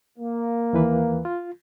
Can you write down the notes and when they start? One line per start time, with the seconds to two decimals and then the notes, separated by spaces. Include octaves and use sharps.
0.17 A#3
0.73 D#2 E3 B4
1.25 F4